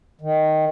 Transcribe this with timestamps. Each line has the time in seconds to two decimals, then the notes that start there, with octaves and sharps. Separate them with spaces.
0.21 D#3